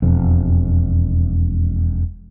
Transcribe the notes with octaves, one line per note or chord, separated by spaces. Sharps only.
E1 F2